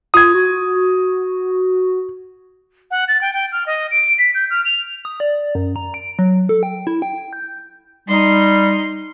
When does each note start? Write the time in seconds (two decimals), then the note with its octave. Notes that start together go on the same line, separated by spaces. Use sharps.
0.14 F4 D#6 G#6
0.34 F#4
2.91 F#5
3.08 A6
3.21 G5
3.34 G5
3.52 F6
3.66 D#5
3.91 D7
4.18 B6
4.35 G6
4.50 F6
4.65 F7
5.05 D#6
5.20 D5
5.55 F#2
5.76 A#5
5.94 D7
6.19 F#3
6.49 A4
6.63 G5
6.87 E4
7.02 G5
7.33 G6
8.09 G3 D#4 C6